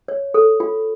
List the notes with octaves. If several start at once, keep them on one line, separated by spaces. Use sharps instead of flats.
C#5
A4
F4